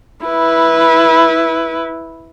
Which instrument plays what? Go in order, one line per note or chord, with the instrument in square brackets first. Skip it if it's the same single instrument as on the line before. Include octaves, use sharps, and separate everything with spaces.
[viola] E4 B4